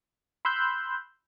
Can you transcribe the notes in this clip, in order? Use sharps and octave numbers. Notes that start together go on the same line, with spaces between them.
B5 C6 E6 F#6 G6